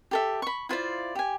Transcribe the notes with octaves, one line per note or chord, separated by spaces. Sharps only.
G4 A4 E5
B5 C#6
E4 F4 C5 D5
G4 G#5